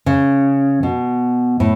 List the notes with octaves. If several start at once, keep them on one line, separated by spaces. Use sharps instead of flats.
C#3
B2
A2